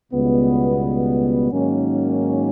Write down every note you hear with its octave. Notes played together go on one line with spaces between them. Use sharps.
C#2 B2 G3 B3
G#2 D#3 F#3 A#3 C#4